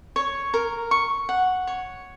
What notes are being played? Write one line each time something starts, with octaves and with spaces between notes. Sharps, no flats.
C#5
A#4
C#6
F#5
C#5